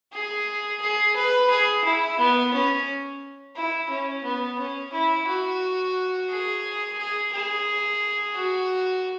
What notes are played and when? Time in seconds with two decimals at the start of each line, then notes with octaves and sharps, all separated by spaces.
0.13 G#4
0.81 G#4
1.16 B4
1.50 G#4
1.84 E4
2.19 B3
2.53 C#4
3.56 E4
3.90 C#4
4.24 B3
4.58 C#4
4.93 E4
5.28 F#4
6.30 G#4
6.98 G#4
7.33 G#4
8.35 F#4